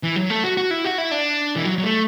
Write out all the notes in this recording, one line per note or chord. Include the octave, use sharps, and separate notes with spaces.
E3
F#3
A3
F#4
F#4
E4
F#4
E4
D4
E3
F#3
F#3
A3